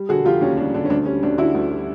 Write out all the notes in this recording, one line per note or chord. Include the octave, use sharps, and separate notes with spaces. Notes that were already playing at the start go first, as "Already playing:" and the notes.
Already playing: G3
D3 F#4 G#4
F1 F4 G4
D#2 C#4
G3 D4
D3 D4
C#4
D2 D4
G3 C#4
D2 D4
D3 E4 F#4
D2
G3